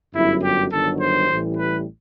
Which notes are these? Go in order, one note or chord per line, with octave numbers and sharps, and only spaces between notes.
G1 F#2 F#3 E4
G4
G1 G2 D#3 F#3 A4
C5
A1 A2 E3 G3
B4